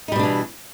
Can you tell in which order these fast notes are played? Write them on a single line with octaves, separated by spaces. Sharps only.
D#4 G3 B2 D4 E3